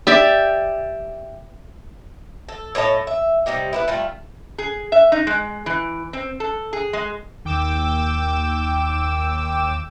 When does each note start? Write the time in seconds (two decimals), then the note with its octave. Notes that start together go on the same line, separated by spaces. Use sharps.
0.07 G4 D5 E5
2.49 A4
2.75 A2 C#5 D#5 A5
3.07 E5
3.46 C3 G3 D#4 G4
3.73 E4 G4 B4
3.88 G3 A3 F4
4.58 G#4
4.92 E5
5.12 D#4
5.27 G#3
5.66 E3
6.13 C4
6.40 A4
6.73 G#4
6.93 G#3
7.45 D#2 G5 D6 E6 E7